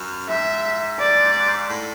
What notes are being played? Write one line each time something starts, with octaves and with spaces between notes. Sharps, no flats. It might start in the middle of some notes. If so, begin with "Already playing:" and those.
Already playing: F#2
G#2 E5
D5
A2